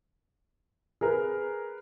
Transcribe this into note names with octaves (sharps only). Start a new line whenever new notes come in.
G#4 A#4 B4